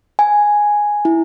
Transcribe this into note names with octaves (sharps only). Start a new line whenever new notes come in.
G#5
E4